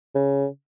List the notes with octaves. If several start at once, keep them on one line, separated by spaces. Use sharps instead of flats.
C#3